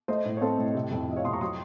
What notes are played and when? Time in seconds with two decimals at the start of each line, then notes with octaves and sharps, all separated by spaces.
0.08 A3 C5 D#5
0.25 A2
0.37 C#5
0.41 C4 A4 C5
0.58 A2
0.75 C3
0.91 F2
1.08 F3 D#5
1.16 C#5 F5
1.24 F2 C6 D#6
1.33 A#5 C#6
1.41 F#3 C6 D#6